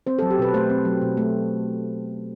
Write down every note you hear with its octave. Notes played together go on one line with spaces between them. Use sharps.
C4 C5
F#3 A4
G4
B2 B4
A3 C5
C4
F#3
B2
A3